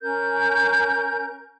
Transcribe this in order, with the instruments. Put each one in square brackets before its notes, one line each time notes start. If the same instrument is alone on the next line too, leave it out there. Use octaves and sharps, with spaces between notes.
[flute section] C#4 A#4 G6